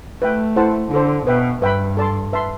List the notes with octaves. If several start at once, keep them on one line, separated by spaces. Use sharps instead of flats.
A3 B4 E5 G5
E4 A4 C5 F#5 A5
D3 D4 A4 C5
B2 B4 E5 G5
G2 B4 E5 G5 B5
A4 D5 A5 C6
B4 E5 A5 C6